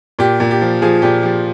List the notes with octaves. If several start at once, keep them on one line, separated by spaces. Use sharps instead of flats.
A#2 G4
A#2
G4
F3
F3 G#4
A#2 G4
F3 G4